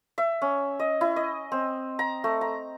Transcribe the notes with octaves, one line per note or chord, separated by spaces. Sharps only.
E5
C#4
D#5
E4
D#5
C4
A#5
A3
A#5